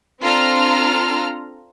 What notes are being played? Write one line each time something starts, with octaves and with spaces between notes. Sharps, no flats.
C4 D4 F4 A4 A#5 F6